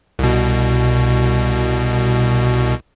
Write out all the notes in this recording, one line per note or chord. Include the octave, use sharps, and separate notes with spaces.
C2 B2